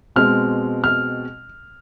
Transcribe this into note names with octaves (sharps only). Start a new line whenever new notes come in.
B2 G#3 C4 F6
F6